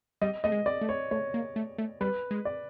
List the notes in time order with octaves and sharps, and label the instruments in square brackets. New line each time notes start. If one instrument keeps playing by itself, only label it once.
[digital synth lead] G3 [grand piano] D#5
[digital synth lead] A3 [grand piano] D#5
[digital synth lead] G#3
[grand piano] D5
[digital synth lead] A3
[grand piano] C#5
[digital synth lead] A3 [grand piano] C#5
[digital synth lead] A#3
A3
A3
[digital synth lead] G3 [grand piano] B4
[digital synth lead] G#3
[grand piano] D5